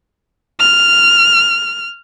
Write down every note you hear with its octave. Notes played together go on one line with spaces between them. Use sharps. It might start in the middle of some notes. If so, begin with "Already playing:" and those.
F6